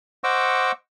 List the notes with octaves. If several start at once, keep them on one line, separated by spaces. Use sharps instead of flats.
C5 D#5 F#5 C#6 D6 E6